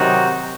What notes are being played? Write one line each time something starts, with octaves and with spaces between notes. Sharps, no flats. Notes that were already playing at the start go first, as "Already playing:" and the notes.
Already playing: C3 D#3 F#3 D#4 F#4